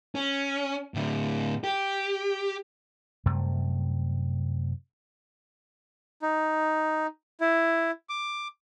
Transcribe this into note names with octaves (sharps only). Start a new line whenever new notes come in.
C#4
A2 D3
G4
F#2 C3 G3 A3
D#4
E4
D6